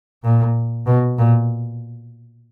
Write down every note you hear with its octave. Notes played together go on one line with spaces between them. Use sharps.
A#2
B2
A#2